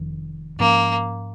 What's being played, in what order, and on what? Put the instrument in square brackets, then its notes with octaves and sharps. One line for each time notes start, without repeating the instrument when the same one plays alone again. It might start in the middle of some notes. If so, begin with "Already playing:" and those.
Already playing: [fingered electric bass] F1 F2 D#3
[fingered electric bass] G#2 F3 C#4 [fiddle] A#3